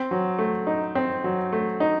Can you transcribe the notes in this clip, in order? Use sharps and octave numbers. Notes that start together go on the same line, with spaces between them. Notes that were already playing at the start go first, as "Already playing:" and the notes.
Already playing: C4
F#3
A3
D#4
C4
F#3
A3
D#4